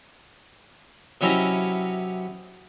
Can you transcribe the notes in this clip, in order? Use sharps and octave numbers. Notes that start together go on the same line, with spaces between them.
C3 F#3 C#4 E4 D#5 A#5